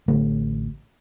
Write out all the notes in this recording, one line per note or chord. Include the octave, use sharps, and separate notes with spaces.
A1 D3 A3